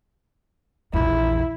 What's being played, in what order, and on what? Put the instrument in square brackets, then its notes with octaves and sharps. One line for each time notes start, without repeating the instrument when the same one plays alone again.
[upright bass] A#1 E2 [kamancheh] E4